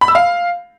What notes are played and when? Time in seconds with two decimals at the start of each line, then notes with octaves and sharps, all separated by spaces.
0.01 B5
0.08 E6
0.15 F5